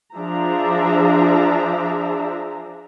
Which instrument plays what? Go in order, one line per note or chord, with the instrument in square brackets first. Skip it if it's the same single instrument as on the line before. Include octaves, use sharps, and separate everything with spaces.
[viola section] F3 D4 G#4 E5 A#5